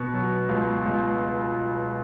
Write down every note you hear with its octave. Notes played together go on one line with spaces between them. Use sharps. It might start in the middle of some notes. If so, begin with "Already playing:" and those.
Already playing: B2 C#6
F#3
C#2
C#2